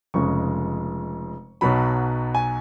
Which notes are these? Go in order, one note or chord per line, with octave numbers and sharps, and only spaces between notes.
F1 F2 C#3 G#3 C#6
B1 B2 F#3 B5
G#5